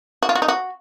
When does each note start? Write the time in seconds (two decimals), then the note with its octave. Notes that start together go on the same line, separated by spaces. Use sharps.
0.23 F#4
0.29 F4
0.35 F#4
0.42 D#4
0.48 F#4